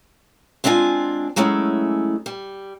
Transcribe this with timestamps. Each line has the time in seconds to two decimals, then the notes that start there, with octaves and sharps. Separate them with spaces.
0.64 G#3 C4 D4 E4 F4 G#5
1.36 F#3 G#3 A3 C#4 E4
2.26 G3